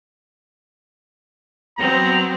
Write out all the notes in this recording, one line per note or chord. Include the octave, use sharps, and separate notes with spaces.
F#3 B3 C4 A#5